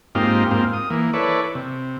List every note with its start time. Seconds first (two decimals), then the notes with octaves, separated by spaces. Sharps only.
0.15 G#2 A#3 C4 D#4 F4 G4
0.51 G#2 A#3 C4 F4
0.73 D#6
0.90 E3 A#3
1.14 E4 A4 B4 C#5 D5
1.55 C3